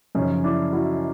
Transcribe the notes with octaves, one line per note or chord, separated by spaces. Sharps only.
F#2 C#3 F3 C#4 D#4
D4 E4
E4 F#4